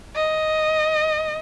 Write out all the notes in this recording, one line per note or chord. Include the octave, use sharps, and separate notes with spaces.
D#5